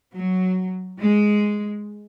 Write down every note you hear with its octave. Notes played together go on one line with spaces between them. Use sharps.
F#3
G#3